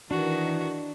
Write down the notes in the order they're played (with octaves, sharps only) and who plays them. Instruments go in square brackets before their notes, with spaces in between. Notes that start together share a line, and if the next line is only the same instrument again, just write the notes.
[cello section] D#3 [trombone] E3 [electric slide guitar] D4 [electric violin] F#4